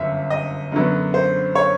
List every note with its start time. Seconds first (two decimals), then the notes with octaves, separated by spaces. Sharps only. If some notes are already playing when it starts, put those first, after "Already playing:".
Already playing: G1 F#2 E5
0.30 D#5
0.72 F#2 D3 F#3 B3
1.14 C5
1.55 C#5